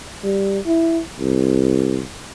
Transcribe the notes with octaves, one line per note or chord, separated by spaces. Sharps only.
G3
E4
C2